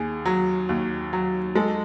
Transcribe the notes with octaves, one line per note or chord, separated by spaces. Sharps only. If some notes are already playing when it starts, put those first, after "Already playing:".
Already playing: D#2 G#4
F#3
D#2
F#3
G#3 A4